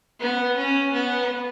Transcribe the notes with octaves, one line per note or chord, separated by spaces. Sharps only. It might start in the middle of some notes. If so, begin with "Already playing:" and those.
B3
C#4
B3